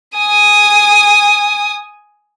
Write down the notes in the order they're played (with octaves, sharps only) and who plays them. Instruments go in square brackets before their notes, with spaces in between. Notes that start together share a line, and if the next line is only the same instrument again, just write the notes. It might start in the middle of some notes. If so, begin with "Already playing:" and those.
[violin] G#5 D#6